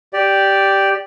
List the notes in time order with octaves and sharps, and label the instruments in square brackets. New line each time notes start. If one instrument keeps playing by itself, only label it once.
[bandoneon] G4 D5